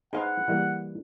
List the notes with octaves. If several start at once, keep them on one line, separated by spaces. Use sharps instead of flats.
D#4 G#4 B4 C5 D#5 F5 F#5
E3 G3 A#3